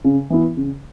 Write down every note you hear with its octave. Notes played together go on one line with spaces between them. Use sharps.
C#3
E3 B3 E4
C#3